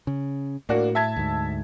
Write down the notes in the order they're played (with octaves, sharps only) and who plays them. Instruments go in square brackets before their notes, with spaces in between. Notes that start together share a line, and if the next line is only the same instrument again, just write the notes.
[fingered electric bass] C#3
[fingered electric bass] A2 [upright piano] A#3 D4 F#4
[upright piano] E5 A5 G#6
[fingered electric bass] D2 G#2